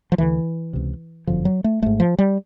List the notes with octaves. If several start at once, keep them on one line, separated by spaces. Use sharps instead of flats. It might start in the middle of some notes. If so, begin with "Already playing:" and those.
F3
D2 D3 E3
C#2 C3
G1 F#2 D3 F3
F#3
A3
G#1 G#2 A3
F3
G3